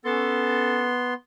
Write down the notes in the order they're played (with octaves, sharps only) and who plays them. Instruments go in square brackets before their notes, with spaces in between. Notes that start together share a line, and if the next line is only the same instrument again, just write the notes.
[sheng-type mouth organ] B3 C6 [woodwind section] C#4 A4